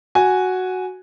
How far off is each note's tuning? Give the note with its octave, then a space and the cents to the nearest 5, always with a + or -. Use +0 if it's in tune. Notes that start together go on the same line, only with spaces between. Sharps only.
F#4 +0 G#5 +0